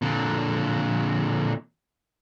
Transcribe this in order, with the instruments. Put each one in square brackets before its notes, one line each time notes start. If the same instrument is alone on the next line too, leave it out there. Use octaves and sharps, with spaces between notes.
[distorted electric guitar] A#2 D3